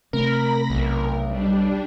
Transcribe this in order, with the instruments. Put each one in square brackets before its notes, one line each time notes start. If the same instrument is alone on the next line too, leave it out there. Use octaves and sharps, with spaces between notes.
[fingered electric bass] C3 A3 C4 [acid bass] A#4 [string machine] B5 A#6
[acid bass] B1 [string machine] A#4
[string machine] G3 D4